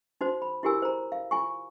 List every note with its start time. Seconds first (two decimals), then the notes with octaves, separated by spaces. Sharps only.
0.21 D#4 F#4 C5
0.42 B5
0.63 E4 F#4 G4 A#4 G#5 E6
0.82 C5 A#5
1.12 F5
1.31 F4 G#5 C#6